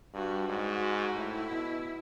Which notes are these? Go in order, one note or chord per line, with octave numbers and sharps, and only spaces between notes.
G2 F#4
G#2 F#4
A2 E4
B2